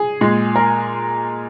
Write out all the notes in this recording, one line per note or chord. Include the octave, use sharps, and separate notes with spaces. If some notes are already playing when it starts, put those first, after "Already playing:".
Already playing: G#4
A#2 G#3
A#4